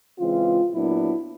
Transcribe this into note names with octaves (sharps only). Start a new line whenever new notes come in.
C#3 E3 G#3 C4 F4
A#2 F#3 B3 D4 E4